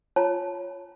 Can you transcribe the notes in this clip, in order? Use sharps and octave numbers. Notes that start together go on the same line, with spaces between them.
F4 C#5 A5 A#5